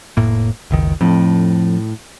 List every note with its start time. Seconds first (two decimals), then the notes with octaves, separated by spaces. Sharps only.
0.17 F1 A2 A#3
0.71 F#1 C#2 D#3
1.01 F2 A2